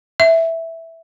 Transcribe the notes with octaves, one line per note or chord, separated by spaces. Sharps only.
E5